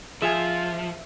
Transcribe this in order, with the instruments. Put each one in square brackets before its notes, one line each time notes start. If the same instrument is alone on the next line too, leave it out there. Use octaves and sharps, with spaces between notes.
[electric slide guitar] F3 [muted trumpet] F4 [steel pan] G#4 G#5 [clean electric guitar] E5